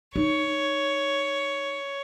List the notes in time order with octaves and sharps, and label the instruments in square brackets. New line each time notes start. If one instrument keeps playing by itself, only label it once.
[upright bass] D#4 [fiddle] C#5